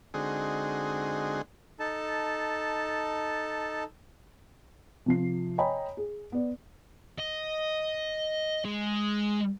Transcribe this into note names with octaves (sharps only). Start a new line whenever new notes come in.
D3 G#3 C4 D#4 F#4 G#4
D#4 A4 A5
C3 F3 C7
C#5 D#5 G5 G#5 A#5 B5
G#4
B3 D5
D#5
G#3